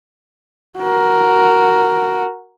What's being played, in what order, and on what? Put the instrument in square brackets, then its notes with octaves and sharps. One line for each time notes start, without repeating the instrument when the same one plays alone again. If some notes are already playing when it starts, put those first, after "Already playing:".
[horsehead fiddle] F#4 A#4